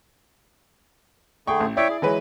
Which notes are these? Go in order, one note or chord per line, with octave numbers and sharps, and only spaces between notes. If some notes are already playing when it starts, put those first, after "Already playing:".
D3 A3 G#4 G5 C#6
A1
E4 C#5 D5 E5 G5
G#4
E3 F#3 G#3 B4